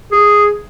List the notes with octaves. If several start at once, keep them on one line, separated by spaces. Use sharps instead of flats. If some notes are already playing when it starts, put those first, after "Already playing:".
G#4